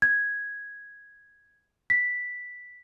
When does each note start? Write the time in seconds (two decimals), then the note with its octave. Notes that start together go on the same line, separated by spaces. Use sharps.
0.02 G#6
1.90 B6